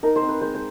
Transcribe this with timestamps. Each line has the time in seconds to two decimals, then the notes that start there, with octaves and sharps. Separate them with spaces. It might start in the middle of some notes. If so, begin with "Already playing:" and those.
0.03 D#4 A#4
0.16 C5
0.22 C4
0.29 B4
0.41 G#3 C5
0.55 C5